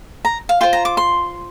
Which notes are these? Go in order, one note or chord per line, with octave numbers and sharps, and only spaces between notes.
A#5
F5
F4 C5 G5
A#5
D6
C6